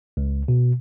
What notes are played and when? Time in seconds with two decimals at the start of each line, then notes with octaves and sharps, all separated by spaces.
0.17 C#2
0.48 B2